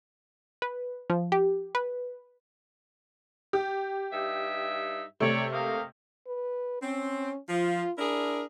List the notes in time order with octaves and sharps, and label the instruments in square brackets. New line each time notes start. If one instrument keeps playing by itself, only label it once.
[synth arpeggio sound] B4
F3
G4
B4
[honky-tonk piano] G4
[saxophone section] G2 D#4 E5
[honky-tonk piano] C3 A3 [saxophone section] C#5 D5
[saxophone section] A#3 D#5 F5
[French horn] B4
[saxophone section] C4 [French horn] C#4
[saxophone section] F3 [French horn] F4
[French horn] D4 [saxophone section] E4 G#4 A#4